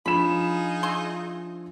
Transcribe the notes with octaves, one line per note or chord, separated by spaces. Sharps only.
F3 D4 D#4 F4 G#4 B5 E7
E5 C6